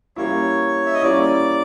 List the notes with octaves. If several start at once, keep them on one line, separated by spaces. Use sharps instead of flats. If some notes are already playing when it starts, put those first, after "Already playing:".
G3 A#3 C#4 E4 C#5
E5
D#5
G3 A#3 C#4 E4 D5